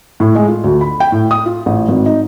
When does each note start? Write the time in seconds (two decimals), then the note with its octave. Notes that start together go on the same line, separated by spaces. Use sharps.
0.20 A2
0.35 G#3
0.48 F4
0.64 D2
0.81 B5
1.00 G5
1.12 A2
1.31 D#6
1.46 F4
1.66 A1
1.88 G#1
2.06 D#4